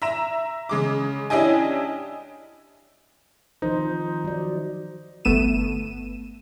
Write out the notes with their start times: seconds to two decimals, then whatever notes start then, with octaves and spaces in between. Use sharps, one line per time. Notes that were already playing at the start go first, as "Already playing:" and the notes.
0.02 E5 A#5 E7
0.69 C#3 G#3 D6
1.30 C#4 D4 E4 G4 D#5 G#5
3.62 D#3 F3 D#4 C5
4.24 F#3 D5
5.25 G1 A3 B3 D#7 E7